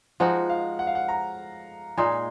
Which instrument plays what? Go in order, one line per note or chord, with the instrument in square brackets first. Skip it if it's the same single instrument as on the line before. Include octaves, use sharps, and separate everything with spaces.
[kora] F3 G#3 D#4 F#4 [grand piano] F#5
[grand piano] F5
F#5
F5
F#5
A#5
[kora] A#2 G#3 D#4 [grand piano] C6